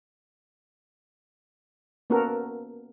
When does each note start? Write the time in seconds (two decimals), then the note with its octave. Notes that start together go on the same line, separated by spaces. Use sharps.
2.10 A#3 B3 C#4 F#4 A4 A#4